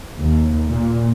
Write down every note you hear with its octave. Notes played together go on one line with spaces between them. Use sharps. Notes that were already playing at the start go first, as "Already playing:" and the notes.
D#2
A#2